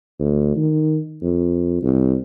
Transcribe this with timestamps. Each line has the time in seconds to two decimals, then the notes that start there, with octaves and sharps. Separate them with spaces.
0.19 D2
0.56 D#3
1.22 F2
1.82 C2